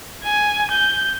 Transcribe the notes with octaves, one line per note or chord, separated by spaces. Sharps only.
G#5
G6